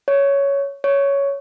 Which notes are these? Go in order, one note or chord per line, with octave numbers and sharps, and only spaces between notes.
C#5
C#5